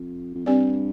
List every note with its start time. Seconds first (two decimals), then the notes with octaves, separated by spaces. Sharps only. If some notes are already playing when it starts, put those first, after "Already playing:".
Already playing: F2
0.34 F2
0.46 G2 C4 G4 B4 D5